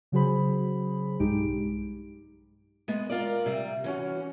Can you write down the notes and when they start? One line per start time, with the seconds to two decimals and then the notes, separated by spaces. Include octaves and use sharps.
0.12 C#3 F#3 F#4 G#4 C5 B5
1.19 B1 G2 G#3 D#4 G4 D7
2.88 G#3 B3
3.10 F4 A#4 D5
3.45 C3 G3
3.84 E3 C#4 F#4